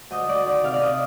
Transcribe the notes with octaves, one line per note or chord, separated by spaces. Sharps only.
D2 D#5
D2 D5
D#3 D5
C3 F5
D5
C3 D#5